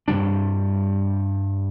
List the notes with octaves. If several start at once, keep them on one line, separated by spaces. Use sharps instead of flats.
G2 C3 G3 D4